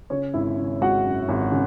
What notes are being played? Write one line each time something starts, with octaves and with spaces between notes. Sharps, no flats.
C#3 C#4 C#5
G#1 E4 E5
C#3
G#3 F#4 F#5
F#2
G#1
C#3